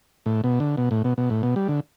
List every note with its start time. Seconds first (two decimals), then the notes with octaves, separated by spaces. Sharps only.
0.26 A2
0.44 B2
0.60 D3
0.77 B2
0.91 A2
1.04 B2
1.18 B2
1.30 A2
1.43 B2
1.56 G3
1.68 D3